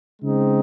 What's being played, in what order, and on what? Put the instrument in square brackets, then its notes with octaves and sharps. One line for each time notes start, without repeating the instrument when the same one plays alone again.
[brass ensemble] C#3 G#3 C4 D#4